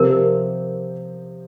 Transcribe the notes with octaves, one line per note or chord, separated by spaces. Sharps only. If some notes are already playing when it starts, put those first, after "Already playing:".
Already playing: C3 F3 C4 G4 A#4